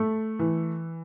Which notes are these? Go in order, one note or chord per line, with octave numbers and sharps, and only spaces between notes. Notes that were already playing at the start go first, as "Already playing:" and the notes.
Already playing: A3
E3